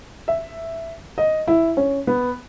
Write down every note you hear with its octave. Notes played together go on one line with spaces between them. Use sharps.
E5
D#5
E4
C#4
B3